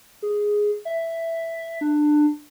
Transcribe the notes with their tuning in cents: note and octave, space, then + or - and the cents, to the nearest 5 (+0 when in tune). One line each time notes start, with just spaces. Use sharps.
G#4 +0
E5 +5
D4 +20